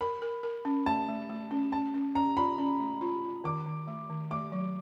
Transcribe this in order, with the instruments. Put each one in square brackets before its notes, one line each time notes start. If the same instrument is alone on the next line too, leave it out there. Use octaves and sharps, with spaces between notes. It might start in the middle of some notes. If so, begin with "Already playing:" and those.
[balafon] A#4 [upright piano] B5
[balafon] A#4
A#4
C#4
[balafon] A3 [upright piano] A5
[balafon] A3
A3
C#4
[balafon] C#4 [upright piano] A5
[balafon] C#4
[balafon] C#4 [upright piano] A#5
[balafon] F4 [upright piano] B5
[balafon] C#4
A3
F4
F4
[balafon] D#3 [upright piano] D6
[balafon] D#3
A3
D#3
[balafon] A3 [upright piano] D6
[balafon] F#3